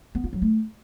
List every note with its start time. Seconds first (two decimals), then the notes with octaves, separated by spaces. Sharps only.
0.15 B3
0.24 F4
0.33 F#3
0.42 A3